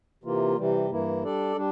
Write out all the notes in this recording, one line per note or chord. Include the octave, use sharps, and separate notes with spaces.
C3 E3 A#3 F4
C3 E3 G3
G2 E3 A#3 E4
G3 D4 A4 D5
G3 D4